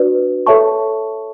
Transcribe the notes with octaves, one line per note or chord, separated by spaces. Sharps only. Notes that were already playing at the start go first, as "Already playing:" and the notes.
Already playing: D4 F#4 B4 D5
A4 C#5 E5 A5 C#6